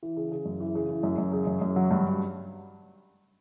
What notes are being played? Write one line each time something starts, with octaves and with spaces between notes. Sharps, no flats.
E3
C#3
C#3
F#2
E3
C#3
E3
F#2
F#2
C#3
F#2
F#2
F#3
G2